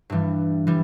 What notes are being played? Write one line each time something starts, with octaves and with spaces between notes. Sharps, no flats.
G2 E3 G3
E3 G3